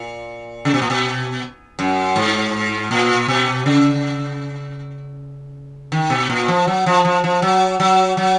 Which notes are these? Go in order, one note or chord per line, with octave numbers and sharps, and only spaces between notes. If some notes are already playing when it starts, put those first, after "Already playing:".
Already playing: A#2
C#3
B2
A#2
B2
F#2
G#2
A#2
B2
C#3
D#3
B2
A#2
F3
F#3
F3
F3
F3
F#3
F#3
F#3